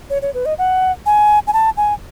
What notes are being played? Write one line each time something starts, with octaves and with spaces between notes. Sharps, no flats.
C#5
C#5
B4
D#5
F#5
G#5
G#5
A5
G#5